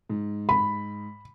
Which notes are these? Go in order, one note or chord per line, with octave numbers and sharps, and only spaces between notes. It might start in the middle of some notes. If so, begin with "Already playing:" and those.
G#2
B5